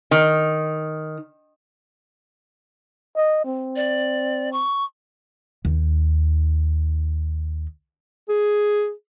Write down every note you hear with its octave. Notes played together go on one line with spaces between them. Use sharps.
D#3
D#5
C4
D5
C#6
D#2 D#4
G#4